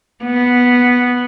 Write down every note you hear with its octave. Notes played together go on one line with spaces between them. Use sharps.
B3